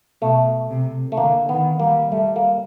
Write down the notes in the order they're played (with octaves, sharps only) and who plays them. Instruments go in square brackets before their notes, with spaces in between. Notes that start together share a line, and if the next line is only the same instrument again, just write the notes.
[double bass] B2 [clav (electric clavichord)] A3
[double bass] C3
[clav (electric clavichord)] A3
[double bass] D3 [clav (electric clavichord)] A#3
[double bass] D#3 [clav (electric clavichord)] B3
[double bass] G3 [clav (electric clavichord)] A#3
[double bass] G3 [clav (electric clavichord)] A3
[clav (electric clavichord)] A#3